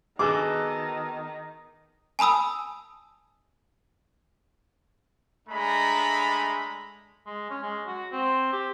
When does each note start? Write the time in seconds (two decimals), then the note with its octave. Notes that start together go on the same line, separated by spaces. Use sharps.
0.19 D#3 B3 F#4 G#4 A4 D6
2.19 G#5 A5 B5 D#6 E6
5.48 G#3 A3 D4 A#5 B5
7.26 G#3
7.50 C#4
7.63 G#3
7.87 F#4
8.12 C4
8.53 G4